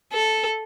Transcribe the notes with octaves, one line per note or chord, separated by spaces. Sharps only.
A4